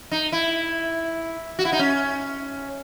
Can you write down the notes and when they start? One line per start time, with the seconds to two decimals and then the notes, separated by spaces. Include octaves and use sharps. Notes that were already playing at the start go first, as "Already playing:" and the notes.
0.12 D#4
0.32 E4
1.59 F#4
1.65 E4
1.72 D#4
1.79 C#4